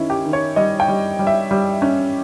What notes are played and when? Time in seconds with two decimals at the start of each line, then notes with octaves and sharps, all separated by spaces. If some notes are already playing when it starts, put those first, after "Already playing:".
Already playing: D#3 C#4 D#4 E4
0.10 G4
0.25 D#3
0.33 C#5
0.56 G3 D#5
0.80 G5
0.88 G3
1.19 G3
1.27 E5
1.51 G3
1.82 C#4